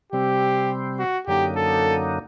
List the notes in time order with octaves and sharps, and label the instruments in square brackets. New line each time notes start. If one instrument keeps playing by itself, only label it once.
[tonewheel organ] C3 G3 C4 [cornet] G4
[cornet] F#4
[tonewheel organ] F#2 D3 F#3 A#3 D#4 [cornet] G4
[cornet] A4